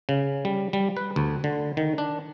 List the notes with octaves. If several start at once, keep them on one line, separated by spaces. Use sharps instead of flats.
C#3
G3
G3
B4
D2
D3
D#3
D4